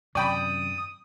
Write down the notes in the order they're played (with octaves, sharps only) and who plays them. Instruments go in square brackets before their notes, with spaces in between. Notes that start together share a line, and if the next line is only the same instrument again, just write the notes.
[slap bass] F#2 C3 D#3 [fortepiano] D5 G5 B5 [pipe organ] D#6